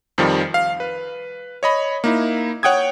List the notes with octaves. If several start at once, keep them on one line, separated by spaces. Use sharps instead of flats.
F2 D#3 F3 G3
F5
B4
C#5 D#5 B5
A#3 D#4 E4
C#5 F#5 G5 D#6 G#6